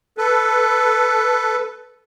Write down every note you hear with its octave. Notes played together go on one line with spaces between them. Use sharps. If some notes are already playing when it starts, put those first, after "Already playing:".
A4 B4